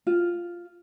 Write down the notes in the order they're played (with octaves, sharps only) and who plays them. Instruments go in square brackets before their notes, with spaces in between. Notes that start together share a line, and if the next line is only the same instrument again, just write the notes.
[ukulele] F4